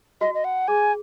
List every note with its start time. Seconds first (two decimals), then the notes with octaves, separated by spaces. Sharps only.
0.21 F#4 D#5
0.34 D#5
0.44 F#5
0.68 G#4 G#5